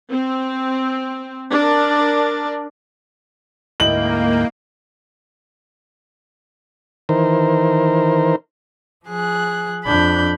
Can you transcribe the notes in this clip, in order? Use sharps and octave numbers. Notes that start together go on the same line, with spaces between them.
C4
D4 A#4
D2 G#2 A#3 E4 D#5 G5 F#7
D#3 E3 A#4 C5
F3 G#4 F#6
F2 D4 B5 G6